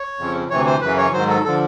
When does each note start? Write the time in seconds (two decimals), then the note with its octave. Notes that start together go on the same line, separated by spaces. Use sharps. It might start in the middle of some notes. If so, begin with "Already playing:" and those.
Already playing: C#5
0.19 F2 C#3 F3
0.50 D2 C3 E3 C#5
0.66 C5
0.82 F#2 C#3 E3 B4
0.98 C#5
1.13 G#2 D#3 F#3 C5
1.29 A4
1.44 D3 F3 A4